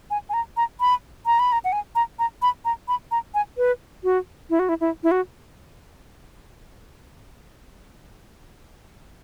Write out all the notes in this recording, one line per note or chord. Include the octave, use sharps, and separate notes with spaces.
G#5
G#5
A#5
A#5
B5
A#5
B5
A#5
F#5
G#5
A#5
A#5
B5
A#5
B5
A#5
G#5
B4
F#4
E4
F#4
E4
E4
E4
F#4